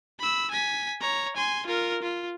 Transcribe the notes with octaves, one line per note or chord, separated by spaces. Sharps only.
B5 E6
G#5 B6
C#5 A#5
G#5 C6
F4 A#4
F4